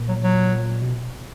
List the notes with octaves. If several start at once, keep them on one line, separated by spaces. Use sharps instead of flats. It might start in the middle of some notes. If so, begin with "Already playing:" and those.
Already playing: A#2
F#3
F#3
B2